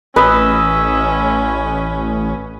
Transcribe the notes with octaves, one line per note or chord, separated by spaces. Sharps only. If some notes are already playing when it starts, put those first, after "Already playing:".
A1 C#4 B4 D#5 E6